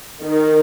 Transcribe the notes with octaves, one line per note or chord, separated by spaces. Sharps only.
D#3